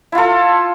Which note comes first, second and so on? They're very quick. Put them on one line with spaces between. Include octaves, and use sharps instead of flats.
E4 F4 A4